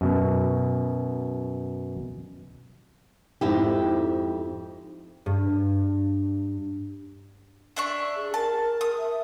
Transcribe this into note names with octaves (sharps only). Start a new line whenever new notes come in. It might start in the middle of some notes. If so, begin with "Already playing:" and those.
F#2 B2
F2 G#2 E4 G4
G2
D4 E5 C#6
G#4
A#4 A5
D#6
E5